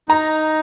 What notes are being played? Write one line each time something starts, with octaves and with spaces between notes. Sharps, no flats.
D#4 A#5